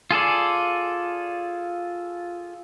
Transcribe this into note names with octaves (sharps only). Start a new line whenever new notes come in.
F4 G#4 A4 D5